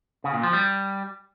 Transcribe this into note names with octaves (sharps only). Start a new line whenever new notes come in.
C#3
A#2
F3
G3